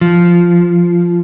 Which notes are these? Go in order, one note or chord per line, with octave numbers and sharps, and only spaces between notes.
F3